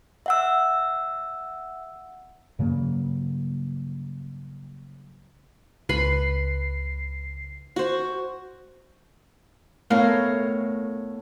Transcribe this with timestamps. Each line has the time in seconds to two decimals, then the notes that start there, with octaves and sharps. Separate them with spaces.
0.26 E5 F#5 E6
2.59 G2 C#3 F#3 A#3
5.89 C#2 B4 B5 C7
7.76 F#4 C5
9.90 A2 A3 B3 A#4 C#5 F5